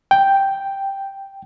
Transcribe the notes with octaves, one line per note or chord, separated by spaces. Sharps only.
G5